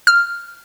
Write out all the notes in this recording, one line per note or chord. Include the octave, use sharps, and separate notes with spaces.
F6